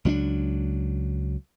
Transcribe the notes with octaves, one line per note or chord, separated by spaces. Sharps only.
C#2 F#3 C#4 D4